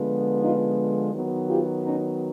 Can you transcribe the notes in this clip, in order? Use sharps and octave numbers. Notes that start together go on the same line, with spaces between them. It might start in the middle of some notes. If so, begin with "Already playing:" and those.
Already playing: D3 F3 G#3 B3
D#4 F4
D#3 F#3 B3
F4 G4
C#4 D#4